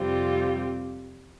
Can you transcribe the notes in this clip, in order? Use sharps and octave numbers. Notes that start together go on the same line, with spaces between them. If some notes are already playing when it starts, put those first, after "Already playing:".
Already playing: F2 C3 G3 C4 F4